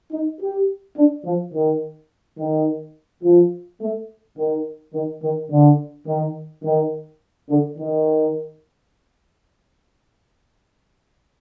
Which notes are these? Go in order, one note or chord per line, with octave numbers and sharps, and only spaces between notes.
D#4
G4
D4
F3
D#3
D#3
F3
A3
D#3
D#3
D#3
D3
D#3
D#3
D3
D#3